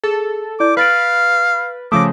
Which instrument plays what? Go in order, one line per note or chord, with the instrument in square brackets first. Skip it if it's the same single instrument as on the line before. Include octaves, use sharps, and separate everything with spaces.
[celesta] G#4 [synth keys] A4
[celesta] E4 D5 G6 [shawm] D6
[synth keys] B4 [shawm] F5 [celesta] F6 A6 D7
[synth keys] C#3 F3 A3 [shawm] D6 [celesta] D#6 A#6